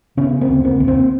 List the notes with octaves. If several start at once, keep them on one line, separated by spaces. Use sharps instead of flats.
C#3 B3 C#4
A#3 C4
D2
A#3 C4
D2
A#3 C4